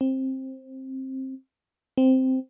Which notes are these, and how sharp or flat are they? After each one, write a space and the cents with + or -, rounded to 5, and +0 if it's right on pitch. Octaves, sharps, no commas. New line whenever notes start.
C4 +15
C4 -5